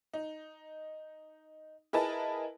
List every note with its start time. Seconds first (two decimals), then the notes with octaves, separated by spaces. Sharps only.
0.14 D#4
1.93 E4 G#4 A#4 B4 D#5 A5